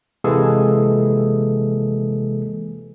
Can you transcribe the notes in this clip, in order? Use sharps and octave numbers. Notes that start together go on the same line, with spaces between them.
C3 E3 G#3 A#3 G#4 A4